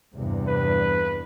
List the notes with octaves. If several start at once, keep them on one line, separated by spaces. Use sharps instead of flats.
E2 G2 C3
B4